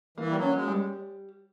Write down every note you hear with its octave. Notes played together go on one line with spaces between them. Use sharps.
E3 A#3
G3
F#3
C#4
G#3
G3